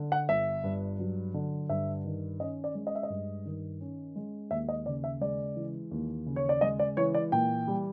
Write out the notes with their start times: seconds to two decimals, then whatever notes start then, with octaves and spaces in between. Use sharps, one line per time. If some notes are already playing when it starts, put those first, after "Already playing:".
Already playing: D3
0.12 F#5
0.29 G1 E5
0.64 G2
0.99 F#3
1.34 D3
1.69 G2 E5
2.05 D#3
2.40 C#4 D#5
2.64 D5
2.75 G#3
2.87 D#5
2.95 E5
3.03 D#5
3.10 G2
3.46 D#3
3.81 C#4
4.16 G#3
4.51 D#2 E5
4.69 D#5
4.86 C#3 D5
5.04 E5
5.21 G#3 D5
5.56 E3
5.91 D#2
6.26 C#3
6.36 C#5
6.49 D5
6.61 G#3 D#5
6.79 D5
6.97 E3 C#5
7.14 D5
7.32 A#2 G5
7.67 G3